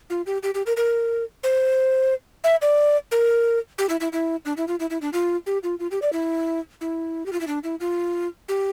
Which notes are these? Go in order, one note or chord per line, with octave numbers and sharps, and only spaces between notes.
F4
G4
G4
G4
A#4
A#4
C5
E5
D5
A#4
G4
E4
E4
E4
D4
E4
F4
E4
E4
D4
F4
G4
F4
F4
G4
D5
E4
E4
G4
F4
E4
D4
E4
F4
G4